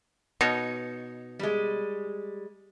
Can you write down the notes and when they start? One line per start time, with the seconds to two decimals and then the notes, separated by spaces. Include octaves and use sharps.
0.41 B2 D#4 C#5
1.39 G3 G#3